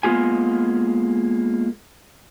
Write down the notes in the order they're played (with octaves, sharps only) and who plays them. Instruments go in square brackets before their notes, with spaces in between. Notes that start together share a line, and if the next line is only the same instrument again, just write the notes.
[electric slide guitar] G#3 A#3 B3 F4 G4 G#5